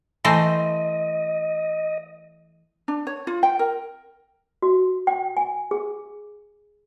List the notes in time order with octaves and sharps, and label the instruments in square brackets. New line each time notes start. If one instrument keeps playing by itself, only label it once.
[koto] E3 A3 C5 [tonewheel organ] D#5
[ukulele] D4
C#5
F4
G5
A#4
[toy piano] F#4
G5
G#5
G#4